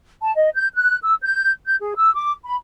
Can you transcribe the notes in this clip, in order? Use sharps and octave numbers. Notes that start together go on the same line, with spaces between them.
A5
D#5
G6
F#6
E6
G6
G6
G#4
E6
D6
B5